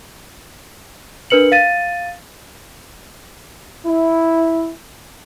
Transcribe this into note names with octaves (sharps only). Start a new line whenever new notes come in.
D4 A#4 B4 C#7 F#7
F5 A6 D#7
E4